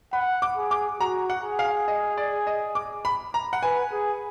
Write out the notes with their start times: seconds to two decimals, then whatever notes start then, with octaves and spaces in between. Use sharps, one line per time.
0.13 F#5 B5
0.42 D6
0.57 G#4
0.71 D6
1.00 F#4 A#5
1.30 F#5
1.44 G#4
1.59 F5
1.88 D#5
2.18 D5
2.47 D#5
2.75 D6
3.05 B5
3.34 A#5
3.53 F#5
3.63 B4 G#5
3.92 G#4